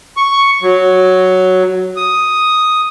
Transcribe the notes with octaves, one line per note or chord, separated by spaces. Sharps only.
C#6
F#3
D#6